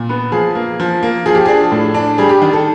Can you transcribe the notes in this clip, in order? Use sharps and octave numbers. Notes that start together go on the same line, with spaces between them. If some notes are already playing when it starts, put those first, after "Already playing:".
Already playing: A#2
B3
F3 G#4
A#3
F3
A#3
F3 G#4
G4
D4 G#4
A2
D4
G3 G#4
G4
D#3
A4